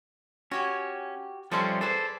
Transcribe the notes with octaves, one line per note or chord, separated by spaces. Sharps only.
C#4 F#4 G4 G#5
F3 G3 C#4 A4 E5 C6
G#4 A4 B4 C5 D5